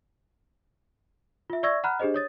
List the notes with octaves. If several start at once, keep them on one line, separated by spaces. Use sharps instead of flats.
F4 E5
D5 E5 C#6 E6 G#6 A#6
F#5 A#5 B5 F6 F#6
D4 G4 G#4 C5 D#5
C#5 D#6 A6